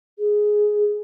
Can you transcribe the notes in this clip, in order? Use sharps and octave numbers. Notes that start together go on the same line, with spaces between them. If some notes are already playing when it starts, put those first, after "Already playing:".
G#4